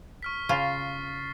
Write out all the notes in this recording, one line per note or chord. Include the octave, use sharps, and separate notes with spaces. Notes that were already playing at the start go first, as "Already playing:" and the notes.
C#6 F6 B6
C#3 F4 C#6 A6 C7